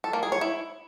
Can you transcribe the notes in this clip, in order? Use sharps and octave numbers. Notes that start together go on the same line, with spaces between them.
A4
A#3
G#4
C#5
E4